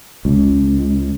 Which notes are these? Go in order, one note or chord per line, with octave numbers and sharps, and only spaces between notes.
C#2